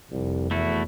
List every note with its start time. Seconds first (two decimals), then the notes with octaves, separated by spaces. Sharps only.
0.12 F1 C2
0.51 E2 A3 E4 F#4